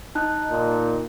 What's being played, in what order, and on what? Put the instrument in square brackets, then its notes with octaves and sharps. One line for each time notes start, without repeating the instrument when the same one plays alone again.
[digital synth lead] D#4 [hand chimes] A5 F#6
[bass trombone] A#2